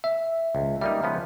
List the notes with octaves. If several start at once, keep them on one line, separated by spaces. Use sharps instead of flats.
E5
C#2
G3 A#3 D#4 E5
C#3 F3 B3